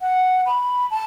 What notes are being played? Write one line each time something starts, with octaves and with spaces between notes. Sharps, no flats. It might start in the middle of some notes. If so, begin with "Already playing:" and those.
F#5
B5
A5